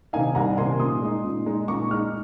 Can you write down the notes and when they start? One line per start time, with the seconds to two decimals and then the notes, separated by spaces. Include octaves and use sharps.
0.13 C3 D#3 A#3 D#4 F5 G#5
0.35 C2 F#5 A#5
0.57 C3 D#3 A#3 D#4 G#5 C6
0.79 A#2 C6 D#6
1.02 G#3 D#4
1.24 A#2
1.46 G#3 D#4
1.68 A#2 A#5 C#6
1.91 G#3 D#4 C#6 F6